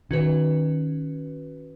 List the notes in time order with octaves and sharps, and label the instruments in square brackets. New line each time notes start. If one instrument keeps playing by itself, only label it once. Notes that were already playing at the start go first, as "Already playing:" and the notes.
[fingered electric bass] D#3 [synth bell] C#4 F#4 B4